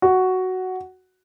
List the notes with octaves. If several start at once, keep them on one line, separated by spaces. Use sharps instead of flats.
F#4